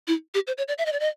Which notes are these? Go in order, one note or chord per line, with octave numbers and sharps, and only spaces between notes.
E4
G4
C5
C#5
D5
E5
D#5
D5
D#5